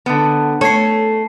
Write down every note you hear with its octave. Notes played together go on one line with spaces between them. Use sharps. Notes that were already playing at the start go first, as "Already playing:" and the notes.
D3 B3
A3 C#5 A5 C7